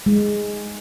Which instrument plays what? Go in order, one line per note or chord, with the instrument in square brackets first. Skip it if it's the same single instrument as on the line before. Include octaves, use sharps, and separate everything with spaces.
[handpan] G#3